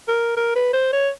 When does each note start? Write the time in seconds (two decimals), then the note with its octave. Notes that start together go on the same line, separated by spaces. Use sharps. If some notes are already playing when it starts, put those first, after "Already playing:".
0.08 A#4
0.37 A#4
0.56 B4
0.73 C5
0.93 C#5